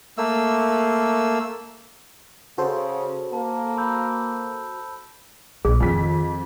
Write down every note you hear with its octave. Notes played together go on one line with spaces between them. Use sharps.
A3 A#3 E6
C#3 F#4 A4 C5
A#3 A5
B5 E6 G6
A#1 G#4
F2 D#3 B6